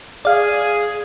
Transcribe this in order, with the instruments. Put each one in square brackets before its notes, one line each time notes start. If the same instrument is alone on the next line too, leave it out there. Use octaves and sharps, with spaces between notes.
[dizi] G#4 [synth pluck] D5 F5